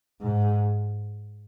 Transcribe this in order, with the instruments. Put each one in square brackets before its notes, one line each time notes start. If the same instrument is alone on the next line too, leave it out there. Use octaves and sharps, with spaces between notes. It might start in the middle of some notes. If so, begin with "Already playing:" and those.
[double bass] G#2